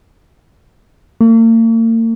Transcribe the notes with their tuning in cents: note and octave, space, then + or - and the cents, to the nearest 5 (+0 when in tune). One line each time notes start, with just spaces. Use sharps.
A#3 -45